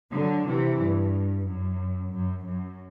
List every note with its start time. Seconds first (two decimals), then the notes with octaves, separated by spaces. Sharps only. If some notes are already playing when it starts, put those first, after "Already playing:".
0.13 D3 F#3
0.47 C3 E3
0.79 G2
1.46 F#2
2.12 F#2
2.45 F#2